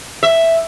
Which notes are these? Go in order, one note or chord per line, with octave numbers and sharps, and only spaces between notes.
E5